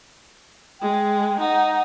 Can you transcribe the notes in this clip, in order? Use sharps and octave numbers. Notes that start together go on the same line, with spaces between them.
G#3 G5
D#4 F#5